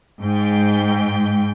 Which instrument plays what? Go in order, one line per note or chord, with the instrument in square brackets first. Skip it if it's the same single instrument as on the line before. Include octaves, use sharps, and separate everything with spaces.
[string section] G#2 G5